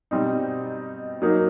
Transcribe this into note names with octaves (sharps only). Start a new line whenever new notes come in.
B2 G3 C4 D#4
F#3 A#3 D#4